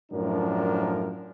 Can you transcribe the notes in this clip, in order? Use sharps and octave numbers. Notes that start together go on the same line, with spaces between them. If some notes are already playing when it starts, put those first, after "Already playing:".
F#2 A2 F3 D4 A#4